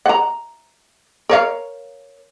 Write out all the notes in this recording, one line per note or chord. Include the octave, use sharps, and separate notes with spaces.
F#5 A#5
A#4 C#5 F5